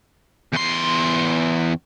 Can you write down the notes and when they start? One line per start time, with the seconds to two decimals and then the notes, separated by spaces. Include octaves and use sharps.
0.53 E2 C6